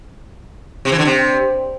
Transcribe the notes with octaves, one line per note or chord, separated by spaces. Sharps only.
C3
E3
D3
C3